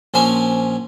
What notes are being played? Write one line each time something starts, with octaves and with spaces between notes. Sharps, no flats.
A#1 F3 C#4 G#5